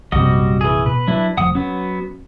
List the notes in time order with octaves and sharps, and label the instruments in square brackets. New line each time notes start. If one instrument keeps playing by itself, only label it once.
[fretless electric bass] A#1 F#2 C3 [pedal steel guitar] G3 F#4 D#5
[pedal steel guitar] E3 G#4
[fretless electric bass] B2 [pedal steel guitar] B4
[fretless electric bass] F#3 [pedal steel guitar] D4 E4 B4
[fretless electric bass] F1 F3 [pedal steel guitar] F#5 D#6
[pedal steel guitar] F#3 B3 [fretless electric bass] C#4